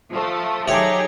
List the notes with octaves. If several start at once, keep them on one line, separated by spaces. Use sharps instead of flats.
F3 A3
F#3 A3 D#4 G4 G#4 C#5